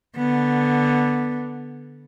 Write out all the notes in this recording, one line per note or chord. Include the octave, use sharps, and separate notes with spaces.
D3 B3